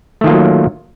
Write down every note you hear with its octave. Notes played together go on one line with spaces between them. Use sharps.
D#3 F#3 A3 A#3 F4